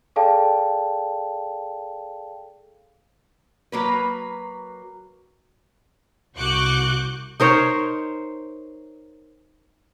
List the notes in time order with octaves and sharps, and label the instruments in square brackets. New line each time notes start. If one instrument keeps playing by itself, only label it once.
[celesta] G#4 A4 D5 F5 G5 A5
[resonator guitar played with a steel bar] F#3 A#3 B4
[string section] C2 F#4 C#6 D6 F#6 G6
[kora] D#4 A#4 C5 C#5